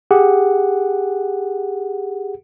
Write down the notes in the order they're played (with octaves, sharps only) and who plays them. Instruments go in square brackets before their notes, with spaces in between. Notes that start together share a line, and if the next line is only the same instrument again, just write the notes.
[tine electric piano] G4 G#4 F#5